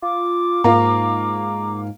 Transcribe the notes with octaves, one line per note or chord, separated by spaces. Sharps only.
F4 D6
G#2 A#3 F4 A#5